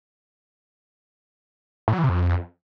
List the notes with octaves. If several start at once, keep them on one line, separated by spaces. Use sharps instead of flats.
A2
F#3
E3
C3
F2